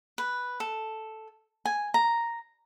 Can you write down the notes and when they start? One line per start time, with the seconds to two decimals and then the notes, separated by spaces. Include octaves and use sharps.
0.18 B4
0.60 A4
1.65 G#5
1.94 A#5